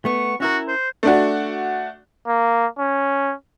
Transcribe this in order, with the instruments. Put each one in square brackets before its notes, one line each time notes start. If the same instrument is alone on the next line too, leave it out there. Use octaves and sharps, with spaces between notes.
[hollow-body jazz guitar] A3 B3 [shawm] C#6
[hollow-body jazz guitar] C#4 E4 A#4 [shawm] F#4
[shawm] C5
[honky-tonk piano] A3 D4 F#4
[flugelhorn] A#3
C#4